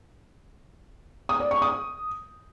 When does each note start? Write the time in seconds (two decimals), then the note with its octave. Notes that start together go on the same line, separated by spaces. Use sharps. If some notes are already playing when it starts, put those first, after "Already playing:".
1.29 D#6
1.40 D5
1.51 C#6
1.62 D#6